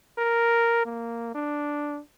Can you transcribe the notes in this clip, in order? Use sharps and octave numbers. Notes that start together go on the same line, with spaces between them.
A#4
A#3
D4